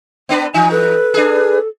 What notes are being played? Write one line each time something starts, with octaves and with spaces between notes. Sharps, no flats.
B3 D4 B4
E3 D#4 G#5
A4 B4
D4 G#4